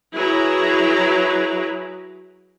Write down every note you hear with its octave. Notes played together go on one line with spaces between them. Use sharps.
F#3 E4 G#4 B4 A#5